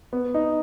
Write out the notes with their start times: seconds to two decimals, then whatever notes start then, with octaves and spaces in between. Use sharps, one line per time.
0.13 B3
0.34 D#4